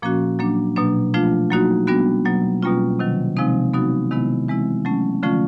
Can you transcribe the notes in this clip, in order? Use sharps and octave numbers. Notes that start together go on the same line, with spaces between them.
A#2 F3 A#3 C#4 F#4
A#2 F#3 A#3 D4
B2 F#3 A#3 D4
F3 A3 D4 F4
F#3 A#3 D#4 F#4
G3 B3 D4 F#4
B2 F#3 A#3
B2 G3 A#3 C#4 F4
C3 D#3 F#3
C3 F3 G#3 C4 D#4
F#3 B3 D#4 F#4
C3 D#3 G#3 B3 E4
E3 G#3 C4 E4
F#3 A3 C#4
D3 F3 A3 C#4 F4